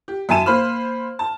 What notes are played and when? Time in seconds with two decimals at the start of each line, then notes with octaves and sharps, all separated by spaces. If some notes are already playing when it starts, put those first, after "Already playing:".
0.08 G4
0.29 F#2 E5 G#5 A5 D#7 E7
0.46 A#3 C5 B5 F6
1.19 A5